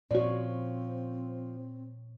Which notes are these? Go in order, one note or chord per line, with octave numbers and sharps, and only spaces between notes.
A#2 F3 C4 F#4 C#5 D5